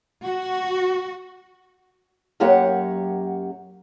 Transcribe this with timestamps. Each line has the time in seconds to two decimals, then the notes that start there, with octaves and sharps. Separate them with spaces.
0.24 F#4
2.40 F#2 F#3 A#3 G4 C#5 F#5